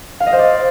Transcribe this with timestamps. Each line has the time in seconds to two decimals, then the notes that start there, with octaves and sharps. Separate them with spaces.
0.20 F5
0.26 D#5
0.33 C5
0.39 D5